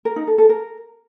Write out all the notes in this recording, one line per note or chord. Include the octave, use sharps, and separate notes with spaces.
A#4
D#4
A4
A4
A#4